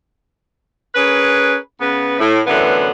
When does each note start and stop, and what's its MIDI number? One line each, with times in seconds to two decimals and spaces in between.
0.95 1.55 61
0.95 1.55 68
0.95 1.55 70
0.95 1.55 71
1.80 2.17 49
1.80 2.17 59
1.80 2.17 71
2.19 2.40 45
2.47 2.89 42
2.47 2.89 45
2.47 2.89 50
2.47 2.89 52
2.47 2.89 59